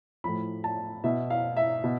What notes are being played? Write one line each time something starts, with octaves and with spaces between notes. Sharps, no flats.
A2 F3 B5
A5
B2 E5
F5
E5
B2